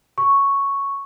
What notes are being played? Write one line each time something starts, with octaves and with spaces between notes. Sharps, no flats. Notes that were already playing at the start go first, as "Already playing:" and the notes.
C#6